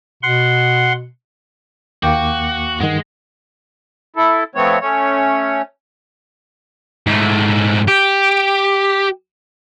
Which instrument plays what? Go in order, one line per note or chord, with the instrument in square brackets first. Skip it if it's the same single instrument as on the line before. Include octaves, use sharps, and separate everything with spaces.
[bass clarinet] B2 [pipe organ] F#5 C6
[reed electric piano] D#2 A#3 D6 [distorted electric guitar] F#4 [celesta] F5 G5 G6
[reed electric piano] G2 D#3 [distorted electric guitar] G#3 [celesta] F#5
[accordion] E4 A4
F3 A3 B3 C4 C#5
A3 C#4 C#5
[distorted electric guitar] G#2 A3
G4